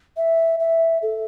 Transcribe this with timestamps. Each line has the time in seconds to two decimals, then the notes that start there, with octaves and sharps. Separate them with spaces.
0.17 E5
0.60 E5
1.02 A4